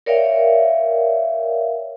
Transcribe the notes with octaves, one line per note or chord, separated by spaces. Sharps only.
A#4 C#5 D5 E5 F5 G5